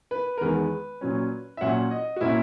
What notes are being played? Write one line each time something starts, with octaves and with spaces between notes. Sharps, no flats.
B4
A#4
E2 D#3 G#3 B3 B4
A#2 F#3 C#4
E5
A#2 F#3 C#4 F#5
D#5
F#4
A#2 A#3 C#4 E4